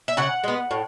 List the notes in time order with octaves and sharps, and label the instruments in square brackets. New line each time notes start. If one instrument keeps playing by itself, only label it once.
[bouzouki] E5
C#3 F#5
G#3 B3
A2